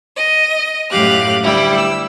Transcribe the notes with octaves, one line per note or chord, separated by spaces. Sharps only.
D#5
F#2 A2 G4 F5 F#6
D2 G3 E4 G5
E6